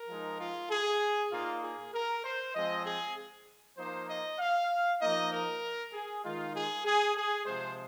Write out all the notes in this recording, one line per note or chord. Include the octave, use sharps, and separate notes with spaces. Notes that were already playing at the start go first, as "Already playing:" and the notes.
Already playing: A#4
F3 G#3 D#4
F4
G#4
A#2 A#3 D#4 F4
G#4
A#4
C5
F3 G#3 C4 D#5
G#4
F3 A#3 D#4 C5
D#5
F5
F3 A#3 D#4 D#5
A#4
G#4
D#3 G#3 D#4 F4
G#4
G#4
G#4
C3 F3 G#3 C5